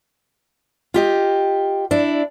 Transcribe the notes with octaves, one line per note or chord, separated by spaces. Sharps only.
F4 G4 D#5
D4 E4